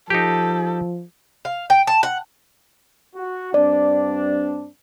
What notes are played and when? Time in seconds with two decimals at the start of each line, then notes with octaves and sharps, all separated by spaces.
0.10 F3 D#4 G4 A4
1.45 F5
1.70 G5
1.87 A5
2.03 F#5
3.16 F#4
3.54 G2 C4 D4 D5